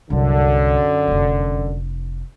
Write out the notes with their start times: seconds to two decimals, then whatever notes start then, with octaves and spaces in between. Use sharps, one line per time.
0.10 C2 F#2 D3 C#4
1.08 F1 D4